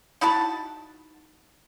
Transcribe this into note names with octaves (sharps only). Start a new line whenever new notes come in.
D#4 E4 F#4 A5